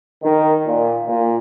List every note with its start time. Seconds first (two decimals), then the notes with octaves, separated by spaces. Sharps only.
0.24 D#3
0.66 A#2
1.07 A#2